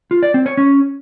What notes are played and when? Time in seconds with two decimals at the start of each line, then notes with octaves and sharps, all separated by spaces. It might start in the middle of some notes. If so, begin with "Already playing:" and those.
0.11 F4
0.23 D5
0.34 C4
0.46 C#5
0.57 C#4